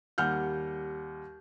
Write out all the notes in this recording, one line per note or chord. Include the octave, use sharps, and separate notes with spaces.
D#2 G3 F#5 F6 G6